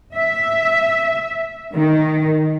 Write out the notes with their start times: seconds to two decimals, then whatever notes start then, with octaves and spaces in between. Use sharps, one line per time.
0.15 E5
1.74 D#3